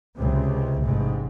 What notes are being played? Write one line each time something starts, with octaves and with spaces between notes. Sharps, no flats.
C#2 C3
A1 G#2 C3